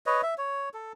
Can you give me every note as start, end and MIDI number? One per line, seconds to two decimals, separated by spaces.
0.06 0.21 71
0.06 0.21 73
0.06 0.21 75
0.23 0.34 76
0.38 0.69 73
0.74 0.93 69